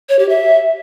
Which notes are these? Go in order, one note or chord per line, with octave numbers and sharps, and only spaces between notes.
C#5
G4
E5